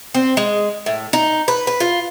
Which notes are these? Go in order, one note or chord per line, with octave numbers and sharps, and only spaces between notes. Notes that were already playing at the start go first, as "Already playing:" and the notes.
C4
G#3
A2
D#4
B4
B4
F4